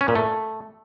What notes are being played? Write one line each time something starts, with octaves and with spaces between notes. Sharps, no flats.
C#4
A#2
A3